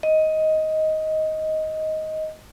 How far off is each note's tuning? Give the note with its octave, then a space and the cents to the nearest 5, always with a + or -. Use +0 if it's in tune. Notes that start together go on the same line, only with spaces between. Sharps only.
D#5 +10